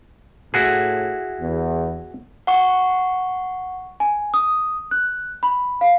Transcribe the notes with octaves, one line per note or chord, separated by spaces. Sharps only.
A2 E4 F#4 G#4
E2
F#5 C#6
G#5
D#6
F#6
B5
F5